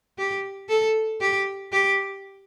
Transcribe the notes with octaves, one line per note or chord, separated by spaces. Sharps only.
G4
A4
G4
G4